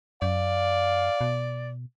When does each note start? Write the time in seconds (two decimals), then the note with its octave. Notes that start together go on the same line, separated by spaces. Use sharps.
0.22 F#2 D5 F5
1.21 B2